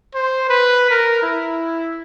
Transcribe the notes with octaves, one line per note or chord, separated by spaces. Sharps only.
C5
B4
A#4
E4